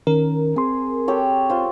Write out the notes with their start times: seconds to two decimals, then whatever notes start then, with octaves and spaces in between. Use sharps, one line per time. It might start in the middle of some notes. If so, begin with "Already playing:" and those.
0.07 D#3 C#4 A#4
0.56 C4 G#4 C6
1.08 G4 A4 C#5
1.50 F4 C5